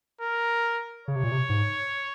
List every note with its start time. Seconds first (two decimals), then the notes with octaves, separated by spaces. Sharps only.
0.21 A#4
1.08 C#3 C#5
1.16 C3
1.24 A#2
1.32 C3
1.49 G#2